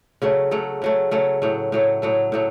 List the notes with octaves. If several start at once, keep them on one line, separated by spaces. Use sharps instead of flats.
C#3 F#3 A3
C#3 F#3 A3
C#3 F#3 A3
C#3 F#3 A3
A2 F#3 A3
A2 F#3 A3
A2 F#3 A3
A2 F#3 A3